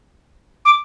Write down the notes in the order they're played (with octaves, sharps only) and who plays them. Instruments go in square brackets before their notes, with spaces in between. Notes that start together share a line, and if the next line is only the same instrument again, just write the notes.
[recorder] D6